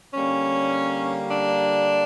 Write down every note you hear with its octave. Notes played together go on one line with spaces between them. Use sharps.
D3 G3 A#3 C#4
D4